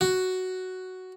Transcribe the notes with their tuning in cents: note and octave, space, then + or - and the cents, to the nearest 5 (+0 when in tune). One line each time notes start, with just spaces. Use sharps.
F#4 +5